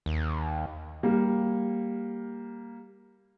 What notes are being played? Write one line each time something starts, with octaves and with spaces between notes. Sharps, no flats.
D#2
G3 A#3 F5